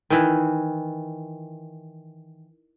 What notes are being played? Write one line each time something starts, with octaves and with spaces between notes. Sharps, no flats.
D#3 E3